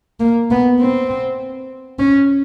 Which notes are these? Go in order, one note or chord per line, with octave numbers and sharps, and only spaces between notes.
A#3
B3
C4
C#4